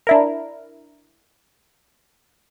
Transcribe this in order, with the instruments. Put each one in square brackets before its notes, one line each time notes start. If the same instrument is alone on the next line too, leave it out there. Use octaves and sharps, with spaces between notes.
[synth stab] D4 E4 A#4